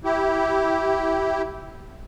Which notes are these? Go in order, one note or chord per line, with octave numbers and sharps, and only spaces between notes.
E4 G4